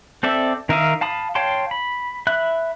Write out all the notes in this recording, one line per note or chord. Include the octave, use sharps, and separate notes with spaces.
C4 A4 D5 E5
D#3 A#4 E5 F5 D#6
F5 A5 B5 D#6
C#5 F5 G5 A5 C6
B5
E5 B5 F#6